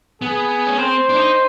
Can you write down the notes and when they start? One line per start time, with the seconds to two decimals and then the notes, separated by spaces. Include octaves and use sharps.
0.22 B3 G#4
0.67 C#4
0.79 C4 C5
1.09 D4
1.16 D#4